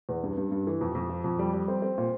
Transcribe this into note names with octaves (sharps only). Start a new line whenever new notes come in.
E2
G2
G2
G2
E3
F2
F2
F3
F2
G3
G3
C4
C4
A#2